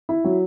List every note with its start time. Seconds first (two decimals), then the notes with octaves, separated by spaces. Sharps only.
0.09 E4
0.24 F#3